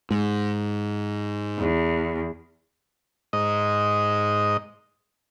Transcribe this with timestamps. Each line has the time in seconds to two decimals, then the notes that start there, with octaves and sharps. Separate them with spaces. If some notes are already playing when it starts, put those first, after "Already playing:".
0.11 G#2
1.59 E2
3.33 G#2 D#5